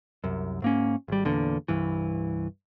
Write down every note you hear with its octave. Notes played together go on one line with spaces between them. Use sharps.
C2 F#2
G#2 A#3 C#4
G#1 G3
E2 A#2 D3
C2 G2 E3